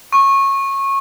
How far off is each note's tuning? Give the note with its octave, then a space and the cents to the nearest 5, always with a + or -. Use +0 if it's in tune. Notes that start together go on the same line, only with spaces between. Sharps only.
C#6 -20